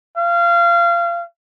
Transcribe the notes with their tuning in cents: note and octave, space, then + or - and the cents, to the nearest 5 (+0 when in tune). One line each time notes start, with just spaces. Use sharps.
F5 -25